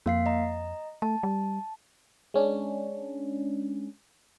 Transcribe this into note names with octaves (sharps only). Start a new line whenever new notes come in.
F2 A#3 F5 C7
D#5 A#5
A3 A5
G3
G#3 C#4 D4